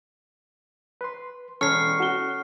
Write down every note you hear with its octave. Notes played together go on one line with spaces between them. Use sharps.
B4 C6
E1 C#4 A4 C#5 C#6 F6 C7
F#4 G7